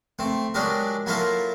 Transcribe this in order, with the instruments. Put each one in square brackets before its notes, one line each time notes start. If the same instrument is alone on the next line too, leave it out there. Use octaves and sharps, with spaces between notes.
[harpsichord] A3 C4
F#3 G#3 D4 G4 A#4
F#3 A#3 E4 F4 A4 A#4